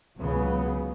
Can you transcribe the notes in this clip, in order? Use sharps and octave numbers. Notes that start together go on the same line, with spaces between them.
C#2 C#3 F#3 B3